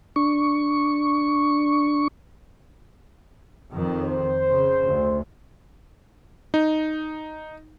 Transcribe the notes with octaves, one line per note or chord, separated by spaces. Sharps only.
D4 C#6
F2 D#3
C5
C#3
D2
D#4